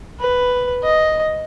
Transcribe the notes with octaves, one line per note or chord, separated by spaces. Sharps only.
B4
D#5